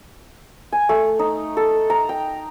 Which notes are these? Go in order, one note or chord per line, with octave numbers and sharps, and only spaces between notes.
G#5
A3
D#4
A4
A#5
G5